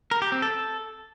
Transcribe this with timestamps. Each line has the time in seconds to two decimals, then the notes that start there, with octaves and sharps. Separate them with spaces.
0.11 A#4
0.22 G4
0.32 C4
0.42 A4